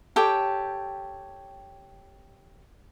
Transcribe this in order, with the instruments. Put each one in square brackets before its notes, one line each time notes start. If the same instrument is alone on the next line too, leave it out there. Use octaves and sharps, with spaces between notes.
[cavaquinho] G4 A4 C#5 G5